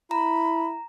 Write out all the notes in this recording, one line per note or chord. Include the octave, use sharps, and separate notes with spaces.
E4 A#5 B5